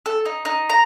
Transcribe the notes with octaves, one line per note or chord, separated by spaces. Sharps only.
A4
D#4
D#4
A#5